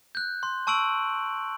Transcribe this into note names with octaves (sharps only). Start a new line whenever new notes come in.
F#6 G6
C6
A5 C#6 E6 D7 F#7